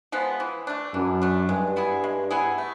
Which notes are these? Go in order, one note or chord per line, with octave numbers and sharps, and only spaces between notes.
F3 G#3 B3
E3
A3 D4
F#2 E3
A3 D4
G2 G#3
B3 E4 G#4
G#3
B3 E4 G#4
A3